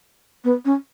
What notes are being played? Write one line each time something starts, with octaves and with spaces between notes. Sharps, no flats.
B3
C#4